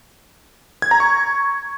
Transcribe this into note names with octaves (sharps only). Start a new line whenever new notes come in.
G#6
A#5
C#6